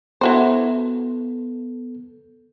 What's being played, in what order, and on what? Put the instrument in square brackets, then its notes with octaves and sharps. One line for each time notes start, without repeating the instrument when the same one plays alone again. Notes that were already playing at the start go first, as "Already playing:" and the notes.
[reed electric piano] B3 A4 [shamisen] E4 F#4 C5